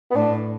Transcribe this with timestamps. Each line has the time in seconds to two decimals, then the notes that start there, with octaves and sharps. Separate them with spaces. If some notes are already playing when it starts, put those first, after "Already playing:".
0.11 B3
0.15 A2 D4